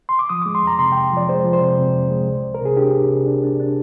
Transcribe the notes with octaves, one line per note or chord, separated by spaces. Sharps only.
C6
D6
F3 D#6
G#3 D6
C6
F2 A#5
C3 C6
F2 G5
F3
D5
G#3 C5
F3
C5
C3
C3
F2
G#3
C2
C2
A#4
C3 G#4
D4 G4
C2
C3
D4
D4
D4